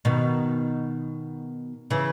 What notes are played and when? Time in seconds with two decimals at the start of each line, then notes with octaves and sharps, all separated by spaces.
0.05 B2 D#3
1.90 C#3 E3